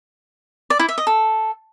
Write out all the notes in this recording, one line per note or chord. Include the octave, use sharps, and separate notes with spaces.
D5
E4
E5
D#5
A4